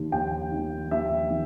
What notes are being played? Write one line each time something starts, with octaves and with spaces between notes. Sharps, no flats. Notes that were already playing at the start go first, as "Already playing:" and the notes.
Already playing: D#2 D#3
D#2 G5
D#3
D#2 E5
D#3